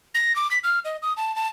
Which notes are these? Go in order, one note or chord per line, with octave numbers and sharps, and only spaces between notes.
A#6
D6
B6
F6
D#5
D#6
A5
A5